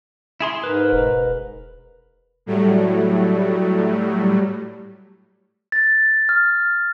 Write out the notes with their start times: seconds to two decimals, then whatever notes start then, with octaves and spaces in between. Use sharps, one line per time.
0.40 E4 G#4 C6
0.64 G#2 A#4 B4
0.93 E1
2.46 A2 F#3 G3 A3
5.72 A6
6.29 F6